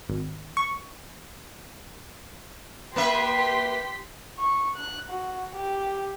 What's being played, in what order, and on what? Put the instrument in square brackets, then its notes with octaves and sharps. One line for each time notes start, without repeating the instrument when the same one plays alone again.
[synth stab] G#1
C#6
[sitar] A#3 B4 E5 [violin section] G4 C6 B6
[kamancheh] C#6
F#6
F#4
G4